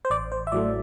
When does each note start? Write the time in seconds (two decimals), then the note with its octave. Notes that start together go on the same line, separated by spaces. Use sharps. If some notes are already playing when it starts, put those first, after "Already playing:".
0.05 C5
0.10 A1 D5
0.32 C5
0.47 E5
0.52 A2 F#3 A3 D5